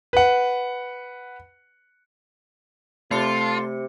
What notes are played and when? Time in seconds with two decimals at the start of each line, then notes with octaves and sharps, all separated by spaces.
0.13 B4 F#5
3.11 C3 A3 F4 A4 A5 C6 C#7